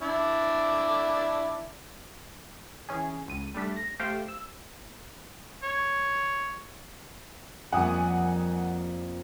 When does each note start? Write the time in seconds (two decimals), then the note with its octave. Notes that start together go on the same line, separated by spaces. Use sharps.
0.02 D4 E4 D5
2.89 E3 C#4 G#4
3.28 C#2 D#7
3.54 G3 A3 D4 B6
3.76 A#6
3.99 A3 G4 C5 F5 G5
4.28 E6
5.63 C#5
7.72 F2 G3 A#3 F#5 G#5 D#6